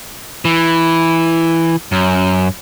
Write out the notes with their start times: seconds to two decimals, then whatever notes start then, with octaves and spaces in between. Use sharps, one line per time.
0.45 E3
1.92 F#2